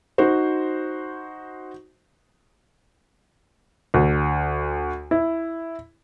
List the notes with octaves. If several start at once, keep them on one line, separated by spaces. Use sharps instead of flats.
D#4 F#4 C5
D2
E4